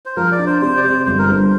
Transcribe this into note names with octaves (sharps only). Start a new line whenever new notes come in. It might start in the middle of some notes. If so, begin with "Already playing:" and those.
C5
F3 A#4
D5
D4
C5
C3 C5
D5
C3 C5
G1 C5
A#4
G2 C5